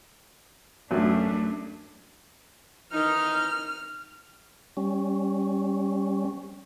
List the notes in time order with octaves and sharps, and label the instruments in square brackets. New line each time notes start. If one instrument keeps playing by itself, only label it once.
[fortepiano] A1 F#2 F#3 [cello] A3 D4
[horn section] D#3 E3 D#4 [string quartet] F6
[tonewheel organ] G3 C#4